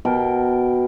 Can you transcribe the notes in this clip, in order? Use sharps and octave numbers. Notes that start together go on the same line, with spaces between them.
B2 A#4 G5 A5